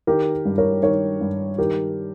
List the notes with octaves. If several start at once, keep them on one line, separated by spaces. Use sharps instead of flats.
D#3 G4 A#4
G2
A#4 C#5
D#3 A#4 C#5
G2
D#3 G4 A#4